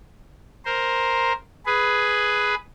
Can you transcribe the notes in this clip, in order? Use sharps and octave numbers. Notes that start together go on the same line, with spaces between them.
A#4 C5
G#4 B4